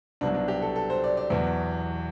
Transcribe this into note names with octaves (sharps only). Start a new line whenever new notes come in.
C2 B2 F#3 D4
D4
G4
A4
A4
C5
D5
D5
E2 B2 F#3